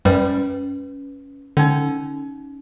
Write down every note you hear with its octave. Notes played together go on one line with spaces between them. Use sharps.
F#2 G3 C#4 B4
D3 C#4 D#4